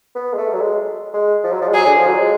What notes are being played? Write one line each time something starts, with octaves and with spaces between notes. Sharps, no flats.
B3
G#3
A3
F#3
G#3
G#3
F3
F#3
F3
G#3
F#3 G#4
D3
F3
F#3
G#3